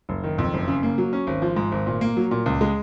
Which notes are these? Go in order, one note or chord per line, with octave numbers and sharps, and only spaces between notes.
F#1
D#3
F2
F#1
C#3
A#3
F#3
C#4
G#1
F3
G#2
G#1
A#2
A#3
F#3
A#2
C#2
G#3